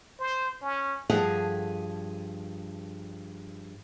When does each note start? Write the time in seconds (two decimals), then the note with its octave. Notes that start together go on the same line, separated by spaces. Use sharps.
0.19 C5
0.62 C#4
1.10 G2 F3 G#4 A4 F5 F#5